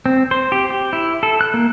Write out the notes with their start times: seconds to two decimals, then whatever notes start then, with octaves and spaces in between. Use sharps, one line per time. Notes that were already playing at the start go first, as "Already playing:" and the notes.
0.06 C4
0.31 C5
0.52 G4
0.70 G4
0.93 E4
1.23 A4
1.41 F#6
1.54 A#3